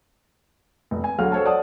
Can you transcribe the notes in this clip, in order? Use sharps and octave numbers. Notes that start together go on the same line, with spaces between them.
F1
G#5
D2 F#3 G#4 F5 F#5 F6
A4 C5 C#5 F5 A5
D5 F#5 A5 D#6